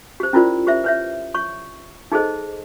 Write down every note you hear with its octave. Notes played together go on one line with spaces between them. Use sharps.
G4 C5
C#4 E4 F4 A#4 C5 D5
G4 C5 E5
B4 C#5 E5
C#5 C#6
D#4 G#4 A4 C5 D#5